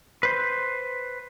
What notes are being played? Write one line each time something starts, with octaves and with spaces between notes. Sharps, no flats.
B4 C5